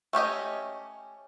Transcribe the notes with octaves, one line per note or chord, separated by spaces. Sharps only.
A3 C#4 G4 D#5